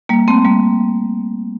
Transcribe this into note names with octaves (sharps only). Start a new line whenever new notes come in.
G3 A#3
A3 C4
G3 A#3